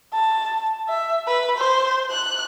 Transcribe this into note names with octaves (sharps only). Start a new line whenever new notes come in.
A5
E5
B4
C5
F#6